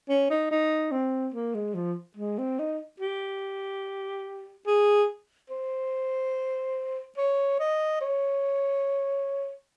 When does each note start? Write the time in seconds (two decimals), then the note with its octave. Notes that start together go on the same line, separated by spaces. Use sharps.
0.09 C#4
0.30 D#4
0.51 D#4
0.91 C4
1.34 A#3
1.55 G#3
1.75 F3
2.17 G#3
2.38 C4
2.59 D#4
3.00 G4
4.66 G#4
5.50 C5
7.18 C#5
7.59 D#5
8.01 C#5